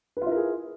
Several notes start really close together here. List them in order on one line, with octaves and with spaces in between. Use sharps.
B4 F4 E4 A#4 G#4